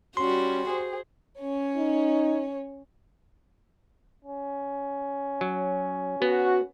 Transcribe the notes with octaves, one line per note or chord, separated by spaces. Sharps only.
G3 C#4 F#4 C6
G#4 C5
C#4 C#5
D#4
C#4
F#3
B3 F#4